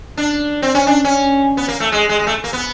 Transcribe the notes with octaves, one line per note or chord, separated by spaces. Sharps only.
D4
C4
C#4
D4
C#4
B3
A#3
A3
G#3
G#3
G#3
A3
A#3
B3